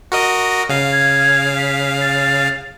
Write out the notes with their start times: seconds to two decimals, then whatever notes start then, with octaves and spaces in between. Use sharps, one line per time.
0.12 F#4 A#4 D#5
0.69 C#3 F5
0.92 G#6
1.57 B6
2.01 A6